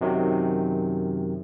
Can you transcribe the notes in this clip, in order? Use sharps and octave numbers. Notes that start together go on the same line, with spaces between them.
F#2 C3 D#3 F#3